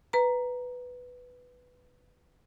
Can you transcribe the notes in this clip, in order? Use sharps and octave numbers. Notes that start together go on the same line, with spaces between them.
B4 A#5